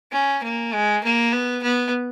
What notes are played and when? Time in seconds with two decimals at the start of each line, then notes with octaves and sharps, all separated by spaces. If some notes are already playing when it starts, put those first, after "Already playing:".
0.12 C#4
0.43 A#3
0.73 G#3
1.04 A#3
1.33 B3
1.63 B3